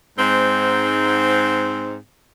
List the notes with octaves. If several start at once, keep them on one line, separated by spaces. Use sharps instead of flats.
G#2 C4